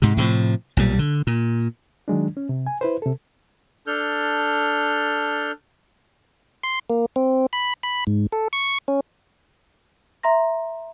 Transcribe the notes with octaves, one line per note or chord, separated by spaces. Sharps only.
G#2 C3
A2 C3 E3 F3
B1 A#2 G3
D3
A#2
D#3 F#3 G#3 D4
C#4
C3
G#5
E4 B4 C5
C3 A4
D4 A4 F6 G6
C6
A#3
C4
B5
B5
G#2
A4
C#6
C#4
E5 A#5 C6 A#6